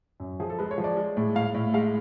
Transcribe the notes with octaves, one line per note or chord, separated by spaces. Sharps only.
F#2
F3 G#4
A4
G#3 B4
C#5
F3
D5
G#3
A2
A2 F5
A2
G#3 F5